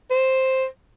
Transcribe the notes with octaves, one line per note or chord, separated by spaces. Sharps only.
C5